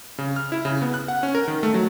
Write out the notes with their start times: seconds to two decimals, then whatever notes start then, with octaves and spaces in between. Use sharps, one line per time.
0.18 C#3
0.36 F6
0.52 E4
0.65 C#3
0.82 B3
0.94 F#6
1.08 F#5
1.23 C#4
1.35 A#4
1.48 D#3
1.63 A3
1.74 F#3